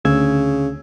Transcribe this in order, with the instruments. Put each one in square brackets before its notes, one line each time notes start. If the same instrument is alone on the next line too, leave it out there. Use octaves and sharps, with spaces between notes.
[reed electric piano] D2 E6 G#6 [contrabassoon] C#3